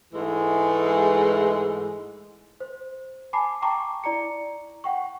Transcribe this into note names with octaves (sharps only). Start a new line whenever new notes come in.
G#2 E3 G#3 A3
C5
G#5 A5 B5 D6 C7
G5 A5 A#5 C#6 D6
E4 D5 A#5 C#7
F#5 G5 C#6